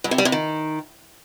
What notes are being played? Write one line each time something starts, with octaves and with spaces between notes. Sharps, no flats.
G2
C3
G3
C3
D#3